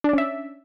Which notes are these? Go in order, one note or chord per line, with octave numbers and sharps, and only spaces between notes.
C#4 D4 D5 E5